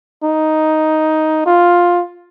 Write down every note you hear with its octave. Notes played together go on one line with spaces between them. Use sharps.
D#4
F4